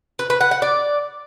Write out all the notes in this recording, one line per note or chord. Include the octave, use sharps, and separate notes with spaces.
B4
B4
F#5
F#5
D5